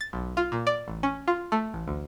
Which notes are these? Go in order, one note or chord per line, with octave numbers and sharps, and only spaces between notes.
A6
B1
F4
A#2
D5
A1
C#4
F4
A3
A1
D2